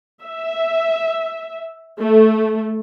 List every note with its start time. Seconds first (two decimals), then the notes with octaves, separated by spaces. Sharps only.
0.23 E5
2.00 A3